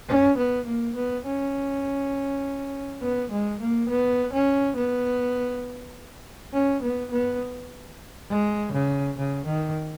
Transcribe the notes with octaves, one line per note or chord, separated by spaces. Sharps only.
C#4
B3
A#3
B3
C#4
B3
G#3
A#3
B3
C#4
B3
C#4
B3
B3
G#3
C#3
C#3
D#3